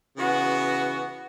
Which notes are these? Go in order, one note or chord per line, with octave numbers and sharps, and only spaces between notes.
C#3 E3 B3 F#4